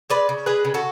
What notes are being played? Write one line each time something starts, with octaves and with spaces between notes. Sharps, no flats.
G#3 B4 D5
C#3
G#3 G#4 B4
C#3
F#4 A4